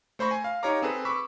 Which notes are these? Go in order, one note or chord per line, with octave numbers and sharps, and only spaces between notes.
A3 C5 B5 C#6 A#6
G#5
F5
D#4 G4 C#5 F5 A#5 D6
C4 G#4 A4 B4
B5 C#6 D6 E6 B6